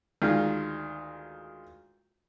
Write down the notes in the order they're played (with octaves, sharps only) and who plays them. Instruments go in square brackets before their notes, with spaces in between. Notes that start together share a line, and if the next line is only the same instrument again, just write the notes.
[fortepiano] D2 D#3 G#3 F4